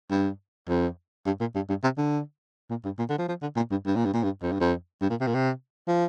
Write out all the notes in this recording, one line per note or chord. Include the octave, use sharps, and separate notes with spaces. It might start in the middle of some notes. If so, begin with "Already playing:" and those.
G2
F2
G2
A#2
G2
G2
C3
D3
A#2
G2
A#2
D3
F3
F3
D3
A#2
G2
G2
A#2
G2
A#2
G2
F2
G2
F2
G2
A#2
C3
A#2
C3
F3